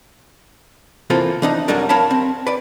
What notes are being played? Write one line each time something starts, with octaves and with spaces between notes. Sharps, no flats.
C3 E3 A#3 F4 A4 C5
E3 D4 D#4
C2 F#2 F#3 G3 D4 A#4
A#4 C#5 F5 A5 B5
C4
B4 D5